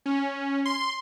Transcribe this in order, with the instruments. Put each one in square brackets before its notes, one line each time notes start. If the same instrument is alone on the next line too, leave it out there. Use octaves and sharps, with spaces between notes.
[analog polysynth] C#4
C6